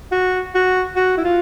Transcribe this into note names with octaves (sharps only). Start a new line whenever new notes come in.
F#4
F#4
F#4
E4
F4